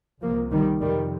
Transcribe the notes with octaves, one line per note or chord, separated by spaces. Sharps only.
C2 C3 F3 A#3
D#3 G3
F2 C3 D#3 G3